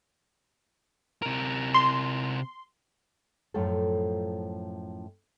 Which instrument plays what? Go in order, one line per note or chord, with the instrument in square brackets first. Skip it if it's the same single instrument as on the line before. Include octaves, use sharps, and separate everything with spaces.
[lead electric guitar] C3 A#4
[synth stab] C6
[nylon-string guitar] F#2 A2 F3 A3 F4 A4